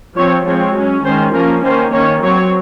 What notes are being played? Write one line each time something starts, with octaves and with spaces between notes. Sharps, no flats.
F3 C4 C#5
F3 G#3 C4 C#5
F#3 C#4
D#3 G#3 C#4 C5
F3 A#3 C#4 A#4
D#3 A#3 C#4 C5
D#3 A#3 C#4 C#5
F#3 C4 C#5